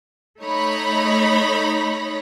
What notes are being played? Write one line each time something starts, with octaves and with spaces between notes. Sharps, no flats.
A3 D#4 C#5 B5 A#6